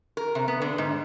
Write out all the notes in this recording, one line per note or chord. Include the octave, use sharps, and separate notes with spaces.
A#4
C3
B3
D3
G#2